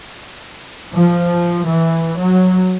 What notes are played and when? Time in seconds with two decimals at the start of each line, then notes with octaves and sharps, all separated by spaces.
0.93 F3
1.64 E3
2.16 F#3